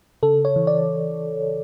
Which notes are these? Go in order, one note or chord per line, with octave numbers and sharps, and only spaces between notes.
C#3 A4
C#5
E3
D5